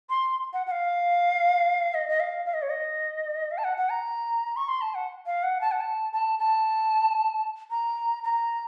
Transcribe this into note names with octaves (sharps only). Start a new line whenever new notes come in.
C6
F#5
F#5
F5
D#5
D#5
F5
F5
D#5
C#5
D#5
F5
A5
F#5
F#5
A#5
C#6
C6
A5
F#5
F5
F#5
A5
F#5
A5
A5
A5
A#5
A#5